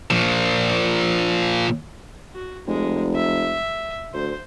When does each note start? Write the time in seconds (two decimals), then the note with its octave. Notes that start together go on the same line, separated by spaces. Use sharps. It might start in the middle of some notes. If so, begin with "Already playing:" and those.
0.11 A#2 F3
2.34 F#4
2.68 F1 G#3
3.15 E5
4.14 D2 C5